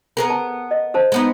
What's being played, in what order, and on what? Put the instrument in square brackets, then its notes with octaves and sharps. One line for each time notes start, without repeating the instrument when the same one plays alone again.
[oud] B3 G#4 A#4
[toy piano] A5
D#5
A4 C5 A5
[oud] G#3 B3 D#4